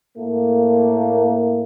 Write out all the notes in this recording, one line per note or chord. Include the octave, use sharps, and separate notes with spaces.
A2 A3 A#3